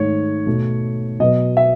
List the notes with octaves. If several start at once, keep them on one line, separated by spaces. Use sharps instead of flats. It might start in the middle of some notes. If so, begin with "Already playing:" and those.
Already playing: G#2 D#3 A3 C#5
B2 A3
B2 F#3 B3 D#5
E5